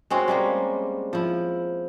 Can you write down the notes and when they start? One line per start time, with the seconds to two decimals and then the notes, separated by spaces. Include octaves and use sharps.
0.10 G#3 C4 C#4 F#4
0.28 G3 G#3 A#3
1.13 F3 E4